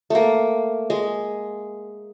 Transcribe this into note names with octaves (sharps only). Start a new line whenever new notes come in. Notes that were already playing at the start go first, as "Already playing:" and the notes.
A3 A#3
G#3